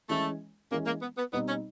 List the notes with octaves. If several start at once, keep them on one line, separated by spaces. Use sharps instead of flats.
E3 G#3 A3 C#4
E3 G#3 A#3 C#4
A#3
B3
B3
B2 G3 B3 C4 D#4
C#4